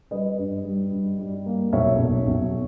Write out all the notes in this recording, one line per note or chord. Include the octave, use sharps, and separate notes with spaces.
G3 B4 D#5
G2
G3
G2
G3
A#3
B1 C#5 E5
B1
B1